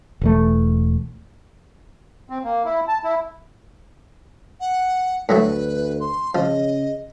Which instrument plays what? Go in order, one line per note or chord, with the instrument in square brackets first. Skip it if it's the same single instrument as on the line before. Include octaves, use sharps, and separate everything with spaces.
[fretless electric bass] E1 E2 A3
[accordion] C4
A#3
E4
A5
E4
[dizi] F#5
[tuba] D2 [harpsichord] A2 F#3 A3 [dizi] B4
[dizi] C6
[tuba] C#3 [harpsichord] F3 [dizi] D#5